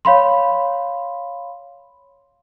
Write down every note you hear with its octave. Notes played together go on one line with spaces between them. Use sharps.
C#5 F5 B5 C6